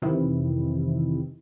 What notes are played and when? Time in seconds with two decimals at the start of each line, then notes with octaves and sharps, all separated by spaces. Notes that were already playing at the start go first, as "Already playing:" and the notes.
0.02 F2 C3 D#3 E3 C4 E4